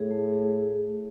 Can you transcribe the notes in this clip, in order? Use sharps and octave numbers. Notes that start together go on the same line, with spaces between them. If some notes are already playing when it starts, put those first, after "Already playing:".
Already playing: A2 G#4
A3
G#4